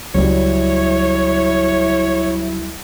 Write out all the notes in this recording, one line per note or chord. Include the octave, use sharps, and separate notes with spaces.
C#2 F#3 G3 E4 C#5